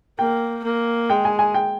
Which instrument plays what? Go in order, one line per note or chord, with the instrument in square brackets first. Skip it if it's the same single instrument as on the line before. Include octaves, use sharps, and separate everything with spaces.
[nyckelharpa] A#3 [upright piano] G5
[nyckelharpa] A#3
[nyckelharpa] G#3 [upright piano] G5
[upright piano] G#5
G#5
G5